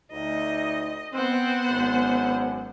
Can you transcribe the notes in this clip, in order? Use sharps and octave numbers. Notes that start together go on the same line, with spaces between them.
D2 D#4 D#5
B3 C4 C5 F#5
G#1 F#2